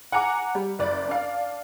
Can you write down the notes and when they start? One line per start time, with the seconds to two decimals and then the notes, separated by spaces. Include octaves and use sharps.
0.12 F#5 G#5 A#5 D6
0.55 G3
0.79 F#1 D5
1.09 D4 D5 F5